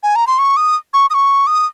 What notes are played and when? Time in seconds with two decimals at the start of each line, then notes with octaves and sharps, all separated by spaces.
0.03 G#5
0.16 A#5
0.27 C6
0.39 C#6
0.57 D#6
0.94 C#6
1.10 D#6
1.14 C#6
1.47 D#6